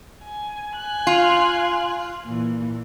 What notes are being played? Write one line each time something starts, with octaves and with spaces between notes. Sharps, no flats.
G#5
G#5 F#6
F4
A#2 E3